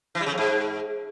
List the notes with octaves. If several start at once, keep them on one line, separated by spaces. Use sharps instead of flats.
E3
G3
C#3
F2
G#2